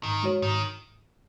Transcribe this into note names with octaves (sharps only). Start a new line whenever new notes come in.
G#2 D#3
G#3 F#4 C#5
G#2 D#3